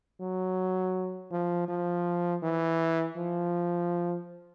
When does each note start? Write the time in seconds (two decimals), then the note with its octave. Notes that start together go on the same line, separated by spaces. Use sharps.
0.20 F#3
1.31 F3
1.68 F3
2.43 E3
3.17 F3